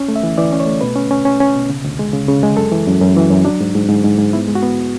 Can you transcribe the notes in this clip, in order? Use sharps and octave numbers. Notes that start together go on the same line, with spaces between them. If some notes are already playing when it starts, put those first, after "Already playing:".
Already playing: C#4
A3
E5
E3
E3 D5
C#4
C#5
A3
B2 B4
C#4
C#4
C#4
C#4
B2
C#3
D2
G#3
C#3
C#3
G#3
F#2 A4
E3
F#2
F#2
E3
F#2
F#3 D4
G#2
G#2
G#2
G#2
G#2
B3 E4
G#3
F#4
B3